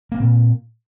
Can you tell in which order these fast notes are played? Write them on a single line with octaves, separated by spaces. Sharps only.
A#3 C4 A#2